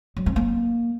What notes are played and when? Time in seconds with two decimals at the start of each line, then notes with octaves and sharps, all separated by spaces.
0.17 F#3
0.26 C4
0.36 A#3